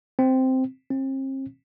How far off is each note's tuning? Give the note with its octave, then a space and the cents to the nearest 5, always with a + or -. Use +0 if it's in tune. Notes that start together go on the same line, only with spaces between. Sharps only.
C4 -5
C4 +40